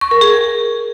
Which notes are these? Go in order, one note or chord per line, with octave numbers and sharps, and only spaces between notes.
C#6
A#4
G#4